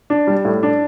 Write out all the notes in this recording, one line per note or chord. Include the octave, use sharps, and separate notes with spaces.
D4
G3
A2
D4